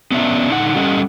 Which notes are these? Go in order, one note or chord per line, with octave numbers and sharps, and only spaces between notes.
B3 C#4 D4 E5
D3 D#4 F#5
G3 C#4 A4 D#5 F#5